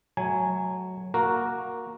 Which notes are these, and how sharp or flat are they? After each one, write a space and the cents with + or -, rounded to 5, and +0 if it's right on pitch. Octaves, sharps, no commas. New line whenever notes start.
F#3 +0 A3 -30 G#5 +0
A#3 +0 F#4 -5 A#4 +0